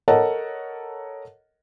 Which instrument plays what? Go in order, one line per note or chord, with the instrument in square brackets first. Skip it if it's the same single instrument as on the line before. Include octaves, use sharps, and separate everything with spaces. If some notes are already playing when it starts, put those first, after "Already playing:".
[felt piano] A4 A#4 C#5 D#5 F#5 A5